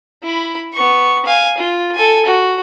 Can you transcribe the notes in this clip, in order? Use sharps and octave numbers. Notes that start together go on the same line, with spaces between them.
E4 B5
B3 C#6
F5 G#5
F4
A4 G#5
F#4